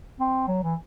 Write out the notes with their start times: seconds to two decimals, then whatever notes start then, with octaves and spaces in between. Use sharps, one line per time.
0.20 C4
0.48 F#3
0.63 E3